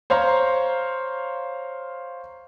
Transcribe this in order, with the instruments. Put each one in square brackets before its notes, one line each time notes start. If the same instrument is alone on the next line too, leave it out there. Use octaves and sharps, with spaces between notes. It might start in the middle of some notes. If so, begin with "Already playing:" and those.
[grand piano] C5 C#5 F5 A#5 C6